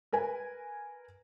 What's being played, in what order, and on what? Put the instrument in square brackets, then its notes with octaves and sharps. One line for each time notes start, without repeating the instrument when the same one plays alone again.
[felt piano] A#4 B4 G#5